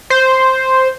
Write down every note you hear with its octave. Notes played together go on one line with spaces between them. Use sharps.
C5